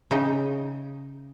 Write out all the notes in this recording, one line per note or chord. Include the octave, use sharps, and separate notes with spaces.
C#3 D#4 G5